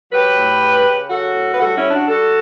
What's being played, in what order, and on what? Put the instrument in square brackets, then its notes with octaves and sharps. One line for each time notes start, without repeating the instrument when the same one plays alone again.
[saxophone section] F#3 G4 B4
A2
C#3
C#3
F#3 F#4 A4
A2
B4
G3 F#4 A4
C#4 E4
C#3
D4 F#4
G3 F#4 A4